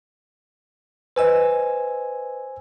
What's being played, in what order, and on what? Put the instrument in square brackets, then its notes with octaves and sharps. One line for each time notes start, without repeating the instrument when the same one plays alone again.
[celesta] B4 D#5 [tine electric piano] C5 G#5 E6